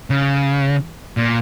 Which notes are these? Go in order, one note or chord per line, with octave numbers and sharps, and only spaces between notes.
C#3
A#2